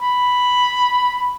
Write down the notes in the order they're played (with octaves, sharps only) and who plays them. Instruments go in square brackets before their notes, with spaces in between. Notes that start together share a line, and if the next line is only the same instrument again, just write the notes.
[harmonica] B5